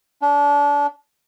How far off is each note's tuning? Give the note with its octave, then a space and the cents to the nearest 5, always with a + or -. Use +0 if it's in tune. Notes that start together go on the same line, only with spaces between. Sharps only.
D4 -30